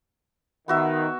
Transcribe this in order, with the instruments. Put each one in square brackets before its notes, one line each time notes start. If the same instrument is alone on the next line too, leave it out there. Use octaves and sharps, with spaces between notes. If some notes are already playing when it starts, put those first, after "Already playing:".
[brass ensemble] D#3 [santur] B3 F#4 E5